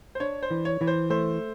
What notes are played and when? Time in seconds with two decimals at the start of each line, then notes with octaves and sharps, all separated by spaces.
0.15 C5
0.20 D4 C#5
0.43 C5
0.51 E3
0.65 C#5
0.81 E3
0.87 C5
1.10 A3 C5